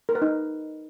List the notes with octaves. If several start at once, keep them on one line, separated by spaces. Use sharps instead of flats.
A#4
B4
D#4